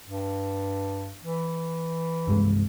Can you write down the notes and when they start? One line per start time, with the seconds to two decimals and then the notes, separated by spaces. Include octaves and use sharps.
0.07 G2
1.23 E3
2.27 C2 G2 G#3